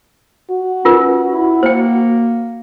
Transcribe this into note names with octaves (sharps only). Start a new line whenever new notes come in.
F#4
C#4 F4 A#4 B4
E4
A#3 C5 G5